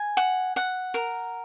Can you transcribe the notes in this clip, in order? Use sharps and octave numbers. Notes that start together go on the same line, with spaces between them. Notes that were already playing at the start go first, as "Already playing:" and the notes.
Already playing: G#5
F#5
F#5
A#4